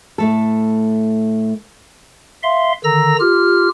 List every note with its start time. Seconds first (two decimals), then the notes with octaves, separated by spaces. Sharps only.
0.18 A2 A3 A4
2.43 E5 F5 C6
2.84 D3 D#3 A#5 E6 A#6
3.20 F4 G4 F6